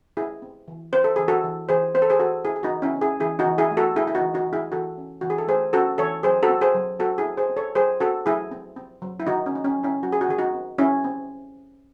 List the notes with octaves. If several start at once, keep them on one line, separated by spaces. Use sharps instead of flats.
C4 E4 G#4
C4
E3
C4 C5
A4
E3 G#4
F#4 A4
E3
E3 G#4 C5
C4 C5
A4
G#4 C5
E3 F#4 A4
C4 E4 G#4
G#4
D#4 F#4
E3
C#4 E4
C4
E4 G#4
E3 E4 G#4
D#4 F#4
E3
E4 G#4
A3
F#4 A4
A3 E4 G#4
E4
D#4 F#4
E3
D#4 F#4
E3
E4 G#4
E3 F#4 A4
C#4
E3 F#4
G#4
A4
A3 G#4 C5
C#4 F#4 A4
E3 A4 C#5
F#3 G#4 C5
F#4 A4
C4
G#4 C5
F#3
C4 F#4 A4
E4 G#4
C4
G#4 C5
C4
A4 C#5
F#3 G#4 C5
C4 F#4 A4
F#3 E4 G#4
C4
C4
F#3
E4
D#3 D#4 F#4
C#4
D#3 D#4
C#4
F#3
C#4 E4
F#3 F#4
G#4
F#4
D#3 G#4
D#4 F#4
C4
C4 C#4 E4
C4